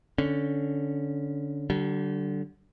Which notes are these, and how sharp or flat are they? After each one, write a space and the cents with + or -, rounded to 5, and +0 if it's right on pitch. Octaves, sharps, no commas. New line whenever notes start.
D3 -10 C#4 +0
D3 +0 G3 -40